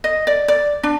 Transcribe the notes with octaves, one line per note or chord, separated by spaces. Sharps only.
D#5
D5
D5
D4